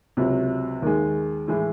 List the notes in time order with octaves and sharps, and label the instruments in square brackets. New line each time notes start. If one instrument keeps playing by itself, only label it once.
[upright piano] C#2 C3 F#3
D#2 D#3 G#3
A2 E3 G#3